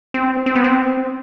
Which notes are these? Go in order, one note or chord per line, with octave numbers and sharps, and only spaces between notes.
C4
C4
B3
C4